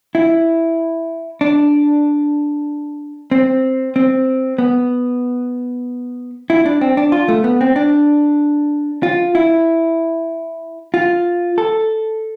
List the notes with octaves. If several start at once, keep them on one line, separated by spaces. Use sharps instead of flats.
E4
D4
C4
C4
B3
E4
D4
C4
D4
F4
A3
B3
C4
D4
F4
E4
F4
A4